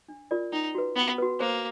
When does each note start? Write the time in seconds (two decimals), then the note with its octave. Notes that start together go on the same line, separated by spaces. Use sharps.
0.09 D4
0.31 F4 A#4 D5
0.53 C#4 D#4
0.75 F#4 B4
0.96 B3 C#4
1.18 F#4 B4
1.40 A#3 C5